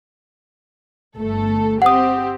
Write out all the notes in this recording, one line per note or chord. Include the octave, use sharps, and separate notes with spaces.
G1 A3 A4
C4 G4 F#5 D#6